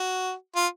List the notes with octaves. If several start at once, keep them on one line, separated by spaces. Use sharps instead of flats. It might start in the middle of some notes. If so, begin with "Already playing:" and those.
Already playing: F#4
F4